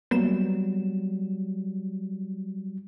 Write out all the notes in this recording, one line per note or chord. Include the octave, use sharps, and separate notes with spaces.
F#3 G3 A#3 B3 E7